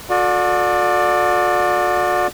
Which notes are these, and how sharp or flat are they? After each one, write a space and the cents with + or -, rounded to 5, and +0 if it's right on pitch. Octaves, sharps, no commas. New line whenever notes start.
F#4 -40 A4 +0 D5 +10